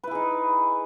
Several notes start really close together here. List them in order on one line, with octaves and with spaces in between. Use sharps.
B4 E4 G#4 D#4